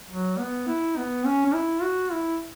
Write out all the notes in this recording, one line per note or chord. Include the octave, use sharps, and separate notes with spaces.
F#3
B3
E4
B3
C#4
C#4
E4
F#4
E4